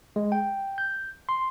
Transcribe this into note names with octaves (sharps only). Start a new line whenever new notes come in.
G#3
G5
G6
C6